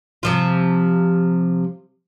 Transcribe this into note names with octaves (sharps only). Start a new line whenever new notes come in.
C3 F3 F4